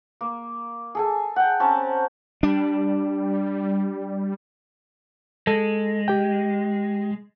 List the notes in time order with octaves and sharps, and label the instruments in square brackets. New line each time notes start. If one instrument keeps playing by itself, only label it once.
[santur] A#3
G#4 A4 G#5
F#5 G5
C4 C#4 A5 A#5
[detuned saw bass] G3 [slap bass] D4
[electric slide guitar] G#3 [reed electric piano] A4
[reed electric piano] G4 G5